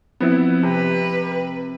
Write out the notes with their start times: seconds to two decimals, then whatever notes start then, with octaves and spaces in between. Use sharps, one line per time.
0.20 F3 B3 C4 E4
0.63 C3 B4